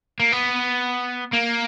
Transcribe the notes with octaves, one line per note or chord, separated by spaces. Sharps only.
A#3
B3
A#3